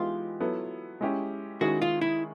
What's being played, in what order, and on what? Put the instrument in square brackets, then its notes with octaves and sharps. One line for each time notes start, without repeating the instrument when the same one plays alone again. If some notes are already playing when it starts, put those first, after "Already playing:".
Already playing: [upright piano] E3 G#3 B3 D#4 G4 [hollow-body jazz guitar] F4
[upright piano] F#3 B3 E4 A4
G#3 C#4 E4 G4
[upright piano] D#3 G#3 C#4 E4 G#4 [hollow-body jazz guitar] F#4
[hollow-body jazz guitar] F4
E4